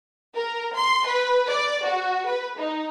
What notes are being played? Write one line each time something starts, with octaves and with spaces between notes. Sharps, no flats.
A#4
C6
B4
D5
F#4
B4
D#4